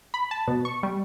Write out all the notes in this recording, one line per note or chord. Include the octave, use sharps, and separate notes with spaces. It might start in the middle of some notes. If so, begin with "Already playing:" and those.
B5
A5
B2
C#6
G3